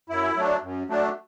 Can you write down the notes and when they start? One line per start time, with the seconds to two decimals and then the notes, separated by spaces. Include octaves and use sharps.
0.09 F#2 E4
0.36 F#3 A3 D4
0.62 F#2
0.88 F#3 A3 D4